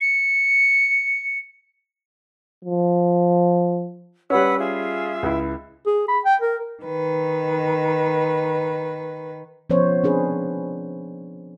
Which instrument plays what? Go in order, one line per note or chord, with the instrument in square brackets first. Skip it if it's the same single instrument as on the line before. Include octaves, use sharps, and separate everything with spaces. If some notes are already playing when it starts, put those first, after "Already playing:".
[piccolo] C#7
[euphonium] F3
[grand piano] G3 C#4 [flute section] B4 F#5 E6
[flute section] F4 G#4 E5
[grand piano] C#2 E4
[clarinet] G#4
B5
G5
A#4
[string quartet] D#3 B4
[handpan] F3 B3 C#4 C5 C#5
C4 D4 G#4 B4